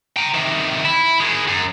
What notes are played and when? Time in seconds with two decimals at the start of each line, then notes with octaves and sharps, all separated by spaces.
0.17 G5 A#5
0.35 C3 D#3
0.85 E4
1.20 D#3 G#3
1.48 F#2